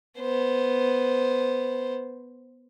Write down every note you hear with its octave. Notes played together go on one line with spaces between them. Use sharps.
B3 C5